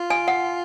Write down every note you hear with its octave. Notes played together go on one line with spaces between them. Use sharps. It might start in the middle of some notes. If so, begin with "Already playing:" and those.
Already playing: F4
G#5
F#5